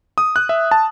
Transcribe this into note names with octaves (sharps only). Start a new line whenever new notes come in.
D#6
F#6
E5
A5